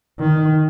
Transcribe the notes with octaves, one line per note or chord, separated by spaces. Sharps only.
D#3